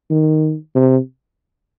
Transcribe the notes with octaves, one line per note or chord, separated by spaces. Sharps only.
D#3
C3